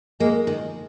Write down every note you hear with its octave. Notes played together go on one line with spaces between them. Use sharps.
G#3 A#3
D#3